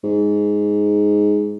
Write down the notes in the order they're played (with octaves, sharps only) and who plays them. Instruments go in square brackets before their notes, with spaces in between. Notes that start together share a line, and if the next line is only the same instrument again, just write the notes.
[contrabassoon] G#2